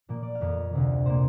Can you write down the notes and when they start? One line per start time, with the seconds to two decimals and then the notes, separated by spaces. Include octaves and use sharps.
0.09 A#2 F3 A#3 F5
0.23 D5
0.35 F5
0.41 F2 F3 A#3
0.73 D2 C3 F3
1.06 A#2 A#3 C5